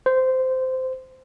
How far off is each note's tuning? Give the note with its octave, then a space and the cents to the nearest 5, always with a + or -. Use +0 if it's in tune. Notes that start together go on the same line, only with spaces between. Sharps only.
C5 -15